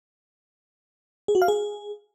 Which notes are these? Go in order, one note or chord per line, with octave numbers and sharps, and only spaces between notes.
G#4
F#4
F5
G#4